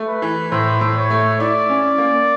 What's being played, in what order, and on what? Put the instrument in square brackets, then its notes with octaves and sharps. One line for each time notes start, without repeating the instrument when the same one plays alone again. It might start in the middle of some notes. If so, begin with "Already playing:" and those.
Already playing: [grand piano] A3
[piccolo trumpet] B4
[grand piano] E3
[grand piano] A2 [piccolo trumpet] C5
[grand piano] A2
[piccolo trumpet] C#5
[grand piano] A3
[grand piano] E4 [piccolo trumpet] D5
[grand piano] C#4
A#3